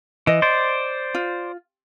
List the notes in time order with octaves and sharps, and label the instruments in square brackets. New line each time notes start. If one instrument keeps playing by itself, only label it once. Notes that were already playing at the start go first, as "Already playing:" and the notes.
[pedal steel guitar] E3 [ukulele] D#5
[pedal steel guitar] C5 D5
[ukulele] F4